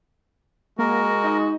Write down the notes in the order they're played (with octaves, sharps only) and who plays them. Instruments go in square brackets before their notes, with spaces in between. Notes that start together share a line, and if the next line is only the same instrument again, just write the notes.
[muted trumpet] G#3 [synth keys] A#3 [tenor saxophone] F#4 [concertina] A#4
[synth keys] D#4 D#5